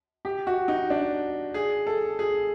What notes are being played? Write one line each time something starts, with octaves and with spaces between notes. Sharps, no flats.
G4
F#4
D#4
D4
G#4
A4
G#4